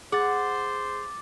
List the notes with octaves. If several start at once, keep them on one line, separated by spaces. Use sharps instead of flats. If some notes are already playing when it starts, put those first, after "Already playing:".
G#4 C5 F#5 D6 A6